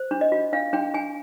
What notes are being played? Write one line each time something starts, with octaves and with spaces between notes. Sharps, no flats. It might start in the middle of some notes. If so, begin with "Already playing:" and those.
Already playing: C5
D4
D#5
F4
D4 F5
D4 G5
D4 G#5